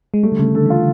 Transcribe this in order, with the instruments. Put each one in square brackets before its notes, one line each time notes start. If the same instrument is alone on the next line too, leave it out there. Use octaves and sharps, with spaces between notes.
[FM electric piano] G#3
[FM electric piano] G3 [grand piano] A3
[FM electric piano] D3
[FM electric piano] C#3 [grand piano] A3
[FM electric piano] D3 [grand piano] A4
[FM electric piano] E3
[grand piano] F4